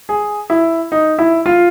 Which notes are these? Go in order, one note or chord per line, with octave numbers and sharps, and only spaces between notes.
G#4
E4
D#4
E4
F4